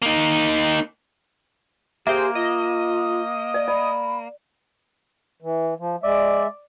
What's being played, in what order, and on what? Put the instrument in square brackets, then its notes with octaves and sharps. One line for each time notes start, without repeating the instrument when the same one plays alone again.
[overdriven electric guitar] A#3 D#4
[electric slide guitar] A#3 [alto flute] G4 [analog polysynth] G#4 C5 G5 [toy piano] E5
[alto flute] F4 [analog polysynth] D#5
[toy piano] D5
[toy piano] D5 [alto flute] B5
[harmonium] E3
F3
[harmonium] G#3 E5 [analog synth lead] D5